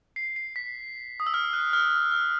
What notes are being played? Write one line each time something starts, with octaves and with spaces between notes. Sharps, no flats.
C7
C7
B6
D#6
E6
F6
F#6
F6
F6